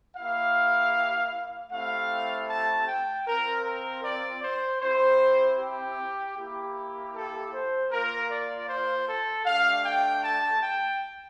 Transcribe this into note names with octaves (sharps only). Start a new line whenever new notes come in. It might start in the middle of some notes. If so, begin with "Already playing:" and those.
A#3 E4 G4 F5
A3 C4 E4 G4 F5
A5
G5
C4 F4 A#4
A#4
D5
C5
C4 E4 G4 C5
G4
A#3 E4 G4
A4
C5
A#3 F4 A#4
D5
C5
A4
A3 D4 G4 F5
G5
A5
G5